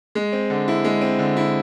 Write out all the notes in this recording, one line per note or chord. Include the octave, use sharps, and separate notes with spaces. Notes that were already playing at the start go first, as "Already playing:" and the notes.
G#3
C4
D3
E4
G#3
C4
D3
E4